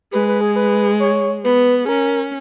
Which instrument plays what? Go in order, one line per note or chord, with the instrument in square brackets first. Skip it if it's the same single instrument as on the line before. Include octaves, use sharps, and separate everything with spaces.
[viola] G#3 [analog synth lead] B4
[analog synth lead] B4
G#4
B4
C#5
[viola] B3 [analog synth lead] B4
[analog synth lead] G#4
[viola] C#4 [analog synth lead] A#4